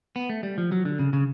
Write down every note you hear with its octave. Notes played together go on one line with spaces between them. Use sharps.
B3
A3
G3
F3
F#3
D3
C#3
C#3